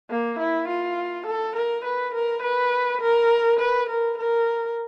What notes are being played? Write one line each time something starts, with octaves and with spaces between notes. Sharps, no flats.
A#3
E4
F4
A4
A#4
B4
A#4
B4
A#4
B4
A#4
A#4